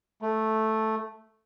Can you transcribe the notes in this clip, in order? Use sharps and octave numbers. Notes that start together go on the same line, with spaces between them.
A3